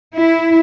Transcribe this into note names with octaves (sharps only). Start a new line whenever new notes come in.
E4